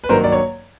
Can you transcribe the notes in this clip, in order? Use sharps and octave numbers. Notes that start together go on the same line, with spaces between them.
B4
G2 D#3 F#3 A#3 A#4 C5
D5
C#5